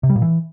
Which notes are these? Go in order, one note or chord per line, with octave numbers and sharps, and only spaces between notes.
C3
G3
A#2
E3